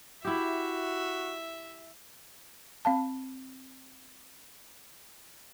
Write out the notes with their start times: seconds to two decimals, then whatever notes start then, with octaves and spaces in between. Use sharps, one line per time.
0.25 E4 F#4 G4 E5
2.85 C4 F5 A5